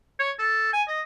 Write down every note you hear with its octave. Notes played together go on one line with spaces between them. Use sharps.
C#5
A4
G#5
D#5